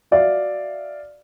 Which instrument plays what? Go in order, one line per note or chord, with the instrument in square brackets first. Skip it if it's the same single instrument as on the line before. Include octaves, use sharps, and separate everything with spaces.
[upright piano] F#4 D5 E5 F5